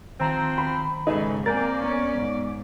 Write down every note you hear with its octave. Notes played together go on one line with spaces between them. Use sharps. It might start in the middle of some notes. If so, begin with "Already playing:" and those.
D#3 F3 C4 A#5
B5
G#2 C#3 A3 D#4 G#4 B4
A#3 C4 A#4 D5 G#5 G6 A6
B3 C#4
G#2